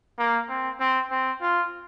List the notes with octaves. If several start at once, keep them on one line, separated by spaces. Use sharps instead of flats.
A#3
C4
C4
C4
F4